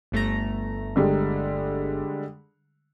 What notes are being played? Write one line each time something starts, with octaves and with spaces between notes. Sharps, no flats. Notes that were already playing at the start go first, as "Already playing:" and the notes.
G1 A3 A#5
D3 G3 G#3